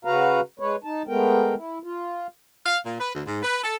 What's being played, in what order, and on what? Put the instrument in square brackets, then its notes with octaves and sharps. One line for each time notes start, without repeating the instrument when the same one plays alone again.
[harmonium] C#3 F#4 B4 F5 A#5
G#3 B4 C#5
D#4 A5
G#3 A3 B3 A#4 G5
E4
F4
[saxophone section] F5
A#2
B4
D2
G#2
B4
A4